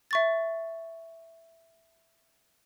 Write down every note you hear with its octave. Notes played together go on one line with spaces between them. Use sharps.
E5 C#6 A6